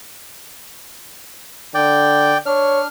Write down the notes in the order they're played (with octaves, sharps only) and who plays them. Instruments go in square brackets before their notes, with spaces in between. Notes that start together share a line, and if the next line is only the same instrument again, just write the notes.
[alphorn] D3 [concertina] D5 G5
[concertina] D4 F6 [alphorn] C#5